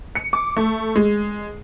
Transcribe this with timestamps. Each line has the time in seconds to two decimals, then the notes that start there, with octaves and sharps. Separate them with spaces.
0.15 C#7
0.33 D6
0.56 A3
0.96 G#3